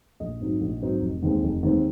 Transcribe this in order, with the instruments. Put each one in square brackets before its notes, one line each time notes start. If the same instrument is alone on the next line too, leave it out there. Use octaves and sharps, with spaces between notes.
[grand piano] A#1 D#5
G#2 F#3 C4 D#4
A#1
G#2 F#3 C4 D#4
F1
D#2 D#3 G#3 C4
F1
D#2 D#3 G#3 C4